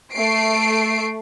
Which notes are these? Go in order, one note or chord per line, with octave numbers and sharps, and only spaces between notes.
A3 C7 D7